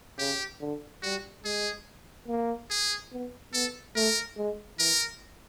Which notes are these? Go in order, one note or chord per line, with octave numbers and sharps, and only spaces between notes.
C#3 G4
D3
G3 F#4
G#3 G#4
A#3
G#4
B3
B3 A4
A3 A#4
G#3
E3 A#4